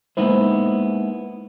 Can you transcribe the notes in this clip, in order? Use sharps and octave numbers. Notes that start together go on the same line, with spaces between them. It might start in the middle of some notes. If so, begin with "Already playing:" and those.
G#3 A#3 B3 D#4 E4 C5